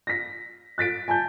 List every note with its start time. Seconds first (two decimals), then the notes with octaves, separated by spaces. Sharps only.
0.07 A#6 B6
0.78 F#6 A6 B6 D7
1.08 G#5 A5 G6